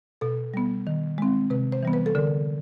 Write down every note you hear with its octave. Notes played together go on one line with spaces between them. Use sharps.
B2 A4
G3 B3
D#3
G#3 C4
C3 B4
C5
E3 G3 B3
B4
A4
D3 A#4